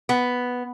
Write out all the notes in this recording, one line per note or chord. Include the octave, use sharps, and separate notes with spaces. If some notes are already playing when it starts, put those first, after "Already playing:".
B3